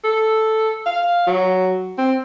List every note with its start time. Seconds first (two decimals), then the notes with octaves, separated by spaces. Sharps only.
0.04 A4
0.86 F5
1.27 F#3
1.98 C4